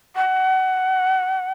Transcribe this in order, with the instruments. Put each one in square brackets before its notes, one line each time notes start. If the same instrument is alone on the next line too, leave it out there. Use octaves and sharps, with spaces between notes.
[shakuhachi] F#5